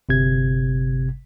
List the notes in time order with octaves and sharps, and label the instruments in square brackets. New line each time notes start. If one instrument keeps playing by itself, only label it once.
[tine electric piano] G1 C3 G#6